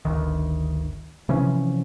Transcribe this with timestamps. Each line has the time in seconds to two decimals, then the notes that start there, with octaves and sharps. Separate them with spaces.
0.05 G1 D2 D#3
1.29 C3 E3 F3 C#4